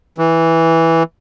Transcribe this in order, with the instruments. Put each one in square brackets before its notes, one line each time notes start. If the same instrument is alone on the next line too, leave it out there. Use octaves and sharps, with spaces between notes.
[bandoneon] E3